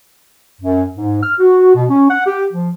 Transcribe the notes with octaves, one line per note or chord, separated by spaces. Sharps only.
F#2
G#2
F6
F#4
B2
C#4
F#5
G4
F3